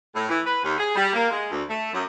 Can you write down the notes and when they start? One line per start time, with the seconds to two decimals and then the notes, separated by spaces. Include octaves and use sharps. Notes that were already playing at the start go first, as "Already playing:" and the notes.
0.14 A2
0.29 E3
0.46 B4
0.63 D#2
0.78 G#4
0.95 G3
1.13 A#3
1.30 G#3
1.51 D2
1.69 A3
1.93 F#2